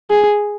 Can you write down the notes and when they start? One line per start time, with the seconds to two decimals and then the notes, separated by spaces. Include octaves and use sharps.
0.10 G#4